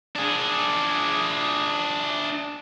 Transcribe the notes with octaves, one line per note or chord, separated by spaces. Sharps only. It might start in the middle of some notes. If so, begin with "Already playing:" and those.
D4 G#4